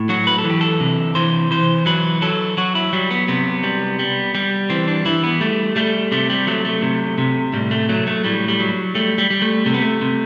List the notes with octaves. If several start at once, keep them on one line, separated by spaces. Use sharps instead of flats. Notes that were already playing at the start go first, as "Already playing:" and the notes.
Already playing: A2
F#3 F#4
B4
A4
E3
G4
A4
C3
E3 C5
E3 C5
F#3 B4
F#3 A4
F#3 F#4
E4
F#3 G3
B3
C3 B3
G3
G3
G3
E3 C4
D4
E3 E4
B3
G3 A3
G3 A3
C3 A3
G3
F#3 A3
A3
C3
C3
A2 G3
A3
F#3 A3
A3
A2 G3
G3
F#3
G3 A3
G3
G3
A3
C3 A3
B3
A3
C3